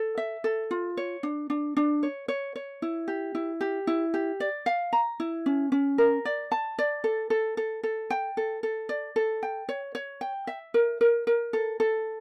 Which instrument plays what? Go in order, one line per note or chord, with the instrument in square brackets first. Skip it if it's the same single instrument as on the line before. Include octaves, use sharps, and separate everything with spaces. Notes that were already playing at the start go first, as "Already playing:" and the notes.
Already playing: [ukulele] A4
E5
A4
F4
C#5
D4
D4
D4
C#5
C#5
C#5
E4
G4
E4
G4
E4
G4
D5
F5
A#5
E4
C#4
C#4
A#4
D5
A5
D5
A4
A4
A4
A4
G5
A4
A4
D5
A4
G5
C#5
C#5
G5
E5
A#4
A#4
A#4
A4
A4